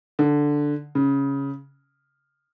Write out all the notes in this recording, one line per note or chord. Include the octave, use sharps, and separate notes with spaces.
D3
C#3